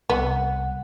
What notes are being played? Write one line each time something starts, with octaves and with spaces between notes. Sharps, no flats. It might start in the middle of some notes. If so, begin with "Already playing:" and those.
C2 B3 F#5